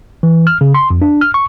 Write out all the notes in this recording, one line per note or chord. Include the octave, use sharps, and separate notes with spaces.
E3
F6
C#3
C6
F2
D4
F6
C#6